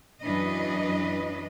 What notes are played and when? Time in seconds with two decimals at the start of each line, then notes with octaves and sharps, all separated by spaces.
0.23 F#2 E3 F#3 D4 B4 D#5